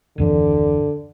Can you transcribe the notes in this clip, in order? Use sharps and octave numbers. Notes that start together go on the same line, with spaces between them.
D#1 F#2 D3 E3